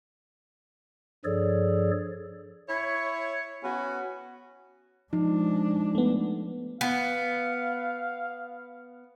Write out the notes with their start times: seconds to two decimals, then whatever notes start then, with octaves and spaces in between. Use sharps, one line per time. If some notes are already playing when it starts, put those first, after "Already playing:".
1.25 G2 F3 G#4 A4 C#5 D5
2.68 E4 C#5
3.63 B3 C#4 F#4
5.13 F3 G#3 D4 D#4
5.95 A3 B3
6.81 B3 F5